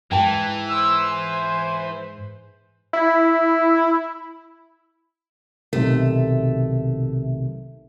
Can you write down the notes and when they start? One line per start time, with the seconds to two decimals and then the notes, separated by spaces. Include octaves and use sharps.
0.11 G#2 E3 G5 A5
0.70 C5 E6
1.08 G#5
2.93 E4
5.73 B1 C3 D#3 A3